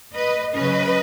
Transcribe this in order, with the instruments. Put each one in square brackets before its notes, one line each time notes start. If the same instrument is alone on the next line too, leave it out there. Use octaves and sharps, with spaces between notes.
[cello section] B4 D#5
C#3 F#3 C#4 B4 D#5